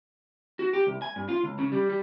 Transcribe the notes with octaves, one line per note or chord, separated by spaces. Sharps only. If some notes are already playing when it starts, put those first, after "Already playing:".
F#4
G4
C2
G#5
G2
F4
C#2
C#3
G3
G3